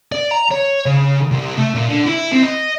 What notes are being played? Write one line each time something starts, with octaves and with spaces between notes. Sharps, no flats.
D5
A#5
C#5
C#3
C2
A3
A#2
D3
E4
C4
D#5